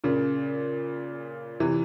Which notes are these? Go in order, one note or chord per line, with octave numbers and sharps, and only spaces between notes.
A#2 C#3
C3 E3